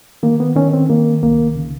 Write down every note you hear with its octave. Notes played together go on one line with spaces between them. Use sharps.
D#3 A#3
B3
D#3 C#4
C4
D#3 A#3
C2 A#3
C#3